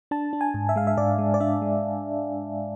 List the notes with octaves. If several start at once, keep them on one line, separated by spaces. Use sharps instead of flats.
D4 A5
D4
G#5
G#2
E5
G#3 F5
E5
G#2 D5
G#3
D5
D4 E5
G#3